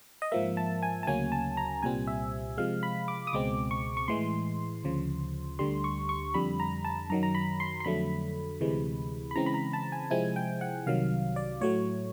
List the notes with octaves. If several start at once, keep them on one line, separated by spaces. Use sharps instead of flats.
D#5
G#2 F3 A#3 E5
A5
G#5
A5
D2 C#3 F#3 A#3 C#4 G#5
A5
A#5
C2 A#2 G3 C4 G#5
E5
C3 F3 G#3 F5
B5
D6
D#6
C#2 B2 G#3 C4 D6
C#6
C#6
A2 E3 G#3 C6
D2 C#3 F3
D2 D3 G3 C6
C#6
C#6
F2 D3 G3 B5
A#5
A5
F#2 D#3 F#3 A#5
A#5
B5
C6
C6
F2 D3 F#3 A3 B5
D2 C3 E3 G#3
B5
C#3 E3 G#3 C4 A#5
B5
A#5
A5
G#5
C3 F3 G#3 C4 E4 G#5
G5
F#5
C2 C3 D#3 F#3 F5
D5
A2 F#3 A3 C#5